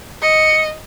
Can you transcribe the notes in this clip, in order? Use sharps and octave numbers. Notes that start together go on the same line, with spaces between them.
D#5 C#7